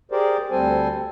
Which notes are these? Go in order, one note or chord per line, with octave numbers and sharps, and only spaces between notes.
G4 G#4 A#4 C5 D5
D2 G3 C4 A4 C5 G#5